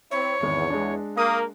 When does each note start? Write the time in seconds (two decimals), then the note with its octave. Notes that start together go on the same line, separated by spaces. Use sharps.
0.11 C4 E4 C#5
0.41 G#1 E2 C#7
0.70 G#3 D4
1.17 A#3 D#6